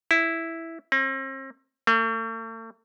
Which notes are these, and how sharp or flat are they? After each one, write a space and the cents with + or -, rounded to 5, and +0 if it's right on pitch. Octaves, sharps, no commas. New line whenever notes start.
E4 -5
C4 +40
A3 +45